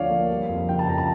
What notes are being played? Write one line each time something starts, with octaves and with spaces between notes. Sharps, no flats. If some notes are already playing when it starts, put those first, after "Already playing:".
Already playing: D2 D3 F3 C#5 D5 F5
A#3
G3
F2
C#3 G5
A5
F2 A#5
A5